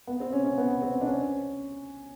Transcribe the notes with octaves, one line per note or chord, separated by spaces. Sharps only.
B3
C4
C#4
C#4
B3
C4
D4
C#4